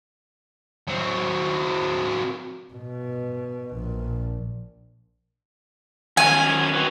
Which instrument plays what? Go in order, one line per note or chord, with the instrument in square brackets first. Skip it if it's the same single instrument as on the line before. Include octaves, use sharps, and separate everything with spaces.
[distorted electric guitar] F#3 C4
[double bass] B2
A#1
[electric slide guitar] D#3 F#3 C#4 [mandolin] G#5
[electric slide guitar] C4 F#4 B4